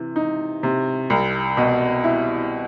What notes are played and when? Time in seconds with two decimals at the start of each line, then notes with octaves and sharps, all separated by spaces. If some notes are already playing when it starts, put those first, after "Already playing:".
Already playing: C3 E3
0.16 D#4
0.63 C3
1.10 C2
1.57 B2
2.04 E4